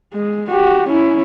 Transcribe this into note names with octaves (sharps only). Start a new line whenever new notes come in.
G#3
F#4 G4
C#4 E4